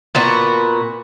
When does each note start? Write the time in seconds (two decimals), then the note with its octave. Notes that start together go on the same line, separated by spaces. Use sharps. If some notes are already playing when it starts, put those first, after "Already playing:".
0.15 A#2 B3 F#4